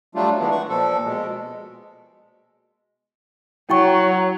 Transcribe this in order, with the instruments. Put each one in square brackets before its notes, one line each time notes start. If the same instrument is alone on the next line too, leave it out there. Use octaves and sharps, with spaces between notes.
[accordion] F#3 G3 A3 D4 F4
D#3 E3 G#3 B3 D4
F#5 C#6
A#2 F3 A4
B2 G#3
[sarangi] F#3 [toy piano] E4 G5 C#6